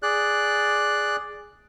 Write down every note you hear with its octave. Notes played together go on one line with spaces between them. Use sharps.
G#4 D5 F#6